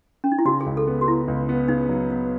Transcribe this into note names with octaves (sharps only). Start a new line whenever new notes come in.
C#4
D#4
E4
C#3 F#4
G#4
C#2
A4
B3
F#4
B3 E4
C#2
B3
C#3 D#4
F#3
B3